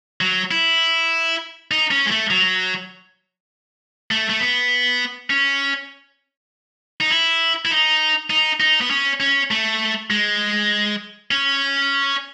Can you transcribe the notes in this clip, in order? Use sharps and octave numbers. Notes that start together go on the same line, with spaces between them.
F#3
E4
D#4
C#4
G#3
A3
F#3
A3
A3
B3
C#4
D#4
E4
E4
D#4
D#4
D#4
B3
C#4
C#4
A3
G#3
C#4